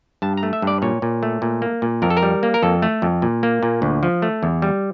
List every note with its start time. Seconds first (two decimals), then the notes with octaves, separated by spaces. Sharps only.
0.22 G2 A5
0.37 A#5
0.43 A3
0.53 E5
0.62 G2
0.67 D5
0.82 A#2 C#5
1.02 A#2
1.23 A3
1.42 A#2
1.62 A#3
1.82 A#2
2.02 F2 A#4
2.10 A4
2.17 A#4
2.22 G3
2.43 A#3
2.54 A#4
2.63 F2 A4
2.82 A3
3.02 F2
3.22 A#2
3.43 A#3
3.63 A#2
3.82 D2
4.03 F3
4.22 A3
4.43 E2
4.62 G3